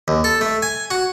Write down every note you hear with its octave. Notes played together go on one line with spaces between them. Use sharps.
D#2
A4
A3
G#5
F#4